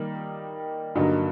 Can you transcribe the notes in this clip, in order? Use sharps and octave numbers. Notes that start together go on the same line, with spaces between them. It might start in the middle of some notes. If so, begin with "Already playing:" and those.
Already playing: D#3 G3 A#3 D#4
G2 D3 F#3 A#3 D#4